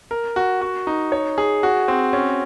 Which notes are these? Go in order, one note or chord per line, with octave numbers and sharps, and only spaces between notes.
A#4
F#4
F#4
D#4
C#5
G#4
F#4
C4
C#4